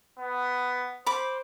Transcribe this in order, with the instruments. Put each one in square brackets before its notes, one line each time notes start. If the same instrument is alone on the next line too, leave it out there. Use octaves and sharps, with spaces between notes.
[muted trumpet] B3
[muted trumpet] C5 [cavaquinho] B5 D6